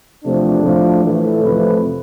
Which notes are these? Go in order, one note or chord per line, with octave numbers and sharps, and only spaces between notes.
E2 C3 F3 A3 D4
A2 F3 A3
A2 E3 A3
F2 C3 F3 A3 B4